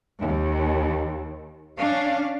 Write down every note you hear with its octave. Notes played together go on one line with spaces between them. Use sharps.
D#2
C#4 D4 F5